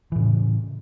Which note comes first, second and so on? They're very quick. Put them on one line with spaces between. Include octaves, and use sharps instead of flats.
E3 A2 C#3